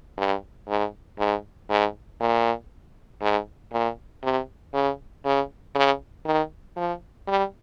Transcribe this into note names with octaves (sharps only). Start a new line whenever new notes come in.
G2
G#2
G#2
G#2
A#2
G#2
A#2
C3
C#3
C#3
C#3
D#3
F3
G3